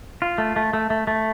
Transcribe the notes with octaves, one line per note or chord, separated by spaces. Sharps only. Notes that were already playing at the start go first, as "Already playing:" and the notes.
F4
A3
A3
A3
A3
A3